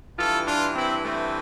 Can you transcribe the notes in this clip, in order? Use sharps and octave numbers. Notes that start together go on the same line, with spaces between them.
G2 E3 F4 A4
D4 F4
C4 E4
A3 C4